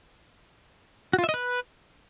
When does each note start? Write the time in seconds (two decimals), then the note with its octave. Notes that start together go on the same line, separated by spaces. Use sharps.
1.13 F#4
1.19 F4
1.24 E5
1.29 D#5
1.34 B4